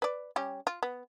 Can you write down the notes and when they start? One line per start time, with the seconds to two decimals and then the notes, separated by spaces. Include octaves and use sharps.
0.02 B4 D5
0.36 G3 C#4 G4
0.67 F4
0.83 B3